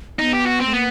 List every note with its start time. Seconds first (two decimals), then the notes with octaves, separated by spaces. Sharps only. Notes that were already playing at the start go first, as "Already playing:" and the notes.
0.19 B3 D#4
0.33 G4
0.46 F#4
0.60 C4
0.66 A3
0.73 A#3 B3